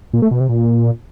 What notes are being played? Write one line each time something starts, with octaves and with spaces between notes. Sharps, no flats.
A#2
A3
B2
C3
A#2